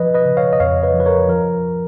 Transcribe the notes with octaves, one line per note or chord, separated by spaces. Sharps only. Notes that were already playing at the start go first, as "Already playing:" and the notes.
Already playing: F3 B4 D#5
B4 D#5
C#3
C#5 F5
D#5
F2 C#5 F5
B4 D#5
F3
B4
A#4 C#5
F3 A#4